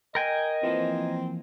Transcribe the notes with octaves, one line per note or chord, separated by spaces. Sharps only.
A#4 D#5 G5 G#5
E3 F3 A#3 C4